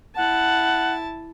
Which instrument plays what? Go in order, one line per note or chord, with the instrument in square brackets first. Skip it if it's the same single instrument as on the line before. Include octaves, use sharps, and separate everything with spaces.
[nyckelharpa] E4 A5 [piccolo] F#5